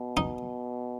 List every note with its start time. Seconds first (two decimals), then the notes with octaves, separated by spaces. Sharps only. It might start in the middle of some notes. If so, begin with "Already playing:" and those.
Already playing: B2
0.17 D#4